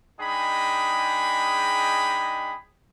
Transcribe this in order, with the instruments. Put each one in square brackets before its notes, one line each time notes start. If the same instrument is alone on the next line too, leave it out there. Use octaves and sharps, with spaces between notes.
[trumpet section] G#3 D4 D#4 G#4 G5 B5